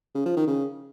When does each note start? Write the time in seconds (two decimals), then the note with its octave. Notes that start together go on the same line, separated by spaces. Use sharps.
0.15 C#3
0.26 F3
0.37 D#3
0.47 C#3